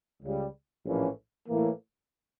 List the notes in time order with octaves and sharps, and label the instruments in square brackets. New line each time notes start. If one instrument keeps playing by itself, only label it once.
[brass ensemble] C#2 C#3 G3
A#1 A2 E3 A#3 C#4
A2 E3 A#3